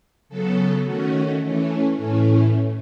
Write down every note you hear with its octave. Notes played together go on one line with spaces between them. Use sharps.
C#3 F#3 B3 A4
D#3 A3 C#4 F#4
E3 A3 C#4
A2 E3 A3 C#4